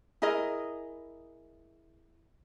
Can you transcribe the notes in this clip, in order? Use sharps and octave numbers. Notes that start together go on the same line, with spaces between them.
E4 G#4 A#4 D#5